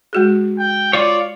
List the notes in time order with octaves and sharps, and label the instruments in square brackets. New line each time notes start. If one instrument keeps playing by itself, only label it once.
[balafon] G#3 F#4 G#4
[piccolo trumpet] G5
[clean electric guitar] F4 C#5 [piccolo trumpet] D5